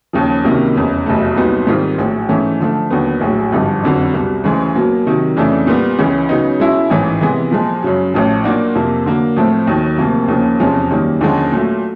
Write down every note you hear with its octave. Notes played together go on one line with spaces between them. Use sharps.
D#2 C#3 F3
C#2 C3 D#3 F#3 A#3
F1 E2 C#3
F1 E2 B2 F#3 A3
C2 A#2 F#3 B3 D#4
G#2 D#3 G3 C4 F4
A#1 A2 F#3
G#2 E3 A3 C#4
D3 F3 A3
D#2 D3 F#3 B3
A#1 A2 F#3
G#1 G2 D3 F3
F#1 F2 D3 F#3
C2 B2 G3
D2 C#3 E3 G#3
B2 F#3 A#3
C3 D#3 F#3
F2 C#3 E3 A3 D4
A#2 G3 B3
C#2 C#3 E3
C#3 F#3 B3 D#4
B2 G#3 C#4 E4
A1 G#2 E3
C3 E3 G#3 B3
A#2 F3 G#3
F#2 C#3 F#3
A1 A2 F3
A#2 F#3 A#3 D4 F#4
F2 C3 F3 A#3
D3 F#3 A#3
A2 F3 A3 C4
D#2 D#3 F#3
D2 C3 F3 A#3
D#2 C#3 F3 A#3
E2 C3 F3 G#3 C#4
F#2 D#3 G3 A#3
D#2 D3 F3 G#3 C#4
A#2 F#3 A3